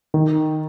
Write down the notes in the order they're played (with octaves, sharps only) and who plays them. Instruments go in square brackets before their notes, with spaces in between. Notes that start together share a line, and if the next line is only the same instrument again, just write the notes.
[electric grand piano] D#3